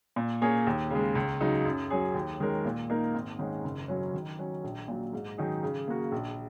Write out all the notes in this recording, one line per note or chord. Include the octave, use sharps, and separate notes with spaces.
A#2
A#3 C#4 G#4 C#5
D#2
C#3 G#3
C#2
C#3 F#3 D#4
F#2
F#3 C#4 G#4
D#2
D#3 G#3 C#4 A#4
A#2
A#3 D#4 A#4
G#1
G#2 D#3 G#3 C#4
F#1
F#2 F#3 C#4
D#3
F#3 C#4
A#1
A#2 F#3
G#2
D#3 F#3 D#4 G#4
C#3
A#3 F#4
A#1